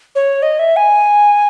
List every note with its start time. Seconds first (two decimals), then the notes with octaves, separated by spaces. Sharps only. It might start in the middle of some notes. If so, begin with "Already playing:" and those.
0.15 C#5
0.42 D#5
0.59 E5
0.76 G#5